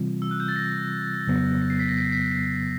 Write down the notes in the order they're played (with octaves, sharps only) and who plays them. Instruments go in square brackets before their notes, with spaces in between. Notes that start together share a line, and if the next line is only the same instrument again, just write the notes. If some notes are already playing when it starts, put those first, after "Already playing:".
Already playing: [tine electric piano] C3 E3 G3 C4 F4
[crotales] E6
F#6
G6
A6
A#6
[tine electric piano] F2 C#3 F#3 B3
[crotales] A#6
C7
B6
A#6
B6
C7
B6
C7